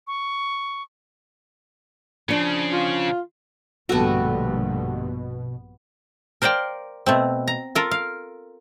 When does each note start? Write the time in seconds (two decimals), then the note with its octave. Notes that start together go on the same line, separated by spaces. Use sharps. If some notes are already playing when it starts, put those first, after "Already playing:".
0.07 C#6
2.29 C#3 F3 D4
2.73 F4
3.89 A#1 G2 B2 D3 G3 A3 B3 F#4
6.42 A#4 C5 D5 F5 G5
7.06 B2 A3 C4
7.48 A#5
7.75 F4 A4 A#4
7.91 F5